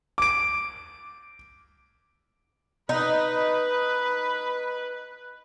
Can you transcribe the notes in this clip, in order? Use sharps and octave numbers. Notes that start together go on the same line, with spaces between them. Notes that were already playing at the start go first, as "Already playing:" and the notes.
D6 D7
D#4 B4